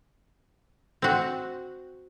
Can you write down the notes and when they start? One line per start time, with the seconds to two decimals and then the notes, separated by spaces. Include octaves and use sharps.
1.02 C4 F#4